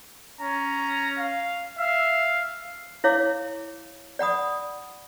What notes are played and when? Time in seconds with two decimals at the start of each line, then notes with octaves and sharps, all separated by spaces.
0.41 C#4 A#5
1.18 F5
1.78 E5 F5
3.04 E4 C#5 F5 D6
4.19 D5 F#5 B5 D#6